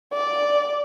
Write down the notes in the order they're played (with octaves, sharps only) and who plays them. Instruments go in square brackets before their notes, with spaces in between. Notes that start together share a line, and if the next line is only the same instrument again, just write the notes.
[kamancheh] D5